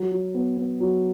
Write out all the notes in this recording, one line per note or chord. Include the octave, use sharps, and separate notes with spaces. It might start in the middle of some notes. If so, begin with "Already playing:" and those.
Already playing: F#3
F#3
B3
B3
F#3